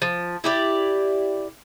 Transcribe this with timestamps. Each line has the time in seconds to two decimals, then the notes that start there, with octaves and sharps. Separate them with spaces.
0.02 F3
0.44 E4 G4 D5